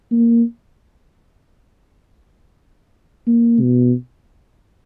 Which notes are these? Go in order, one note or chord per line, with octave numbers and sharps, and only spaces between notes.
A#3
A#3
B2